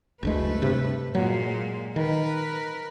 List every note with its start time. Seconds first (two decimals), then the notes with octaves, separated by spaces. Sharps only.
0.23 F#1 D2 G#3 A3 B4
0.62 G2 C3
1.15 A#2 F#3 G#3
1.96 D#3 A#4 B4